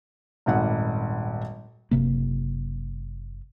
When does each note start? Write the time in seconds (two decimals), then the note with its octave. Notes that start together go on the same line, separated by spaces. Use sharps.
0.46 D#1 G#1 F#5
1.91 F#1 C3 A#3